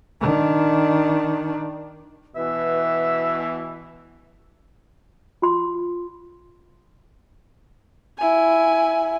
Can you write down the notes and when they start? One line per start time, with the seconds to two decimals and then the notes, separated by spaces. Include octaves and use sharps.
0.21 D#3 D4
2.36 B2 E3 B4 E5
5.42 F4 C6
8.19 E4 G#5